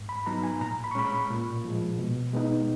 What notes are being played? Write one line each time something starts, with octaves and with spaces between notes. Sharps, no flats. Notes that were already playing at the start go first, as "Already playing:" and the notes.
Already playing: G#2
B5
F#3 B3 D#4 A#5
G#5
A#2 A#5
B5
C#6
G#3 C#4 B5
B5
A#2
F3 G#3
B2
G#3 B3 D#4